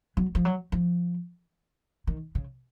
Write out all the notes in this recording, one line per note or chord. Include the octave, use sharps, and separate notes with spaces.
F#3
F3
F#3
F3
D#3
C#3